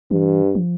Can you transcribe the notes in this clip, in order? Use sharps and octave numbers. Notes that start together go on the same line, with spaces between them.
G2 E3
F3